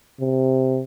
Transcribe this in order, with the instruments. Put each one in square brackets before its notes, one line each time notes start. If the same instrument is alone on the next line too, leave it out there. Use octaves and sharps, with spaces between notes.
[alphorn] C3